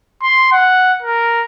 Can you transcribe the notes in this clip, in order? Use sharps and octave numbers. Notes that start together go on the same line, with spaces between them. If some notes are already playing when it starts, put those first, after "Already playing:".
C6
F#5
A#4